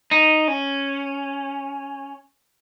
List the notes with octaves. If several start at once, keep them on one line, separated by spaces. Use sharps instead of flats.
D#4
C#4